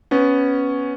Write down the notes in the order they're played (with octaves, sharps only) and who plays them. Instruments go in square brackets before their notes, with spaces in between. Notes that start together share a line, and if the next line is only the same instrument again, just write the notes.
[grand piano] B3 C#4